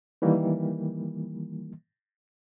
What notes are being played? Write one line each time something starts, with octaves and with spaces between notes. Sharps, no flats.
D#3 E3 G3 A#3